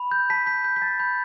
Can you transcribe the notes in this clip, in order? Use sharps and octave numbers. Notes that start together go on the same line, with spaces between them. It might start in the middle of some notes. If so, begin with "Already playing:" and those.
Already playing: B5
G6
A5 B6
G6 B6
G6
B6
A5 A6
B5 G6